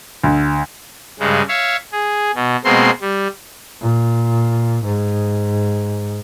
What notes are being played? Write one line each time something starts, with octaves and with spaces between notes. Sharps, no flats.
D2
G2 C#3 G#3
C#5 E5 F5
G#4
B2
B2 G#3 A#3 C4 C6
G3
A#2
G#2